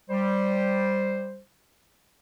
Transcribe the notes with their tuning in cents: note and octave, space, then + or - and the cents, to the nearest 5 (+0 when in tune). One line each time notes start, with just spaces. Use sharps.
G3 +0 C5 +0